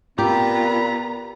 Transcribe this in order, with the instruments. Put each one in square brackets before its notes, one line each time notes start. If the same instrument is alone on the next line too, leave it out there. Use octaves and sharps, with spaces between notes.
[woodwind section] A#2 C4 B5 [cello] B3 F4 [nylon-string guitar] G4 [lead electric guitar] A#5